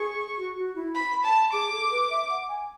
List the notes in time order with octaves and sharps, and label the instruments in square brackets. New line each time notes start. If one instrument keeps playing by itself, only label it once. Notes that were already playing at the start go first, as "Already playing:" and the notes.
Already playing: [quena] G#4 [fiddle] C#6
[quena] F#4
F#4
E4
[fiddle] B5
A5
[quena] G#4 [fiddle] D6
[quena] A4
B4
E5
F#5
G#5